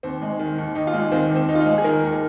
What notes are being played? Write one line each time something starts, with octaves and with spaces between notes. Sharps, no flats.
D#2 C4
G#3
D#3
D#2
D#2 D#4
F4
G#3
F4
D#3 C4
D#2
C4
D#2 D#4
F4
D#4
G#3
G#4
D#3 A#4
D#2